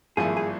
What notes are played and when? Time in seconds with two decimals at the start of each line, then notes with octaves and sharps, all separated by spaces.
0.17 G#1 G2 F3 A#3 E4 G#4
0.37 G#4